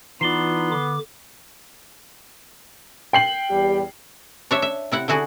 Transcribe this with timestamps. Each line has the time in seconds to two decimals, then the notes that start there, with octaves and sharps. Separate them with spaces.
0.21 E3 B3 D#4 F4 D5 C7 G7
0.72 D3 D6
3.13 G5 C7 F#7
3.50 E2 G3 G4
4.51 D4 C#5 E5
4.62 E5
4.92 C3 E4 F#5
5.08 D3 E4 F#4 G#4